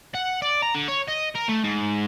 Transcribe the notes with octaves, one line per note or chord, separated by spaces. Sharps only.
F#5
D5
A#5
D3
C#5
D#5
A#4
A3
G#2